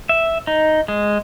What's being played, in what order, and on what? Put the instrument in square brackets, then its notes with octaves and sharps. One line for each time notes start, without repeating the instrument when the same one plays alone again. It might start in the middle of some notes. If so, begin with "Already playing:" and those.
[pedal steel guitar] E5
D#4
G#3